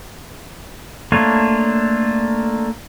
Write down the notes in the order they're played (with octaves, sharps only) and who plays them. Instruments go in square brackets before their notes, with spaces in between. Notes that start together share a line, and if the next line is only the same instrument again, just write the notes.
[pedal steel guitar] A3 A#3 D4 F4 C#5